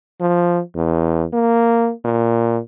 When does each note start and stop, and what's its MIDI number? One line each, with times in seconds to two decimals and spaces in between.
0.21 0.61 53
0.76 1.26 40
1.33 1.92 58
2.05 2.59 46